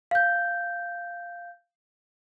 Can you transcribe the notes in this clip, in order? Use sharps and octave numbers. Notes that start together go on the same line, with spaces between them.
F5 G6